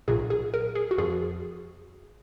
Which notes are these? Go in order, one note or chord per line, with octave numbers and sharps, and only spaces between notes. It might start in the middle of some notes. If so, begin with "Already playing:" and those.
B1 A#2 F#3 G#4
G#4
A#4
G#4
F#4
F2 F3 G#4